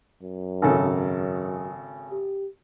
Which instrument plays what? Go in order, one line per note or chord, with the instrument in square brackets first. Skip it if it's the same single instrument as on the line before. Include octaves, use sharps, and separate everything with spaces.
[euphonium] F#2
[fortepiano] G#1 C#3 A4
[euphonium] G4